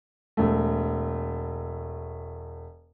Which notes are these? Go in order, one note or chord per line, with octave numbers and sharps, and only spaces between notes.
E1 A3